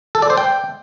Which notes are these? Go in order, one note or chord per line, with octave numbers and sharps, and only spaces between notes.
A4
D5
C5
G5